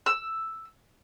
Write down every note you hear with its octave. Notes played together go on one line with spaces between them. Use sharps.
E6